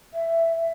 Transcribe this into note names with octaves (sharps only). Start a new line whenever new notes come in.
E5